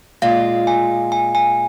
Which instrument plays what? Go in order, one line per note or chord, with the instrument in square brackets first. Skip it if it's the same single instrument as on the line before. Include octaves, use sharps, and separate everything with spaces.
[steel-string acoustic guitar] A#2 G#3 F4 [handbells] F5
[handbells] G#5
G#5
G#5